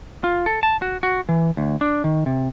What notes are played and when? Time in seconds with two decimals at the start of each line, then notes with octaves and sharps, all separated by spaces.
0.24 F4
0.46 A4
0.63 A5
0.82 F#4
1.03 F#4
1.29 E3
1.57 D2
1.81 D4
2.04 D#3
2.26 C3